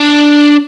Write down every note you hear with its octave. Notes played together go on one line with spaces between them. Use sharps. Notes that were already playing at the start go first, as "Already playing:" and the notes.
Already playing: D4